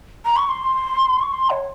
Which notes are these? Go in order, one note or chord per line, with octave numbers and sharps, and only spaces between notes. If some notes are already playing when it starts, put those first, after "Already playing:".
A#5
C#6
C6
C#6
C6
C#5